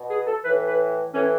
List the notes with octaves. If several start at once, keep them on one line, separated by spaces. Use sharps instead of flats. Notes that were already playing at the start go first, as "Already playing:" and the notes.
Already playing: B2
G#4
A4
A2 E3 B4
B4
A2 E3 C#4